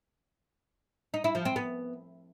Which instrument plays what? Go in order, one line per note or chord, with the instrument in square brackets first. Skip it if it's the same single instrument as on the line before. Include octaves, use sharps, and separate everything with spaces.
[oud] D#4
E4
F3
C4
B3